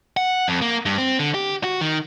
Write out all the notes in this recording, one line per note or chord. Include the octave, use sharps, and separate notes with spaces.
F#5
F2
A#3
G2
C4
D3
G4
F#4
D#3